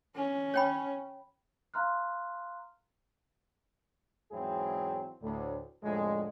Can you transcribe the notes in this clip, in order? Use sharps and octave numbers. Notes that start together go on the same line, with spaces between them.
C#4
C#5 G5 B5
F5 A#5 C6 F6 F#6
E2 G#2 F#3 C4 E4 G#4
D2 A2
C2 F2 A2 D3 G#3